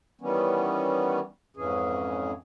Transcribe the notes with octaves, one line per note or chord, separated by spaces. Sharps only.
D#3 E3 G3 B3 C#4
F2 G#2 E3 C#4 G#4